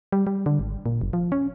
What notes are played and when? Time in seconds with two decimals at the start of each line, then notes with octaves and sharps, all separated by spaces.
0.12 G3
0.27 G3
0.46 D3
0.59 G#1
0.86 A#2
1.01 F#1
1.13 F3
1.32 C#4